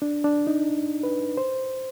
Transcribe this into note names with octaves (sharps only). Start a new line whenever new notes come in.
D4
D4
D#4
B4
C5